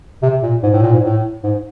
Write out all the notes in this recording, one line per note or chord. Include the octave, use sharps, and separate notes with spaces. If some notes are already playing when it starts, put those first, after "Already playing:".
C3
A#2
G#2
A2
A#2
G#2
A2
G#2